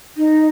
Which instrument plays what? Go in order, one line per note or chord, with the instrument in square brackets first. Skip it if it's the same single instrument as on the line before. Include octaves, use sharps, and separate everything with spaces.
[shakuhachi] D#4